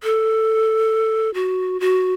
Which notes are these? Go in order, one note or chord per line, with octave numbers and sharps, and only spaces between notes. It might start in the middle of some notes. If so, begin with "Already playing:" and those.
A4
F#4
F#4